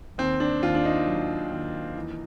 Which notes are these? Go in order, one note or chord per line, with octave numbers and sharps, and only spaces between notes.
D#2 C4
D4
D#2 F4
D4
D#4
F#3
D#2
E3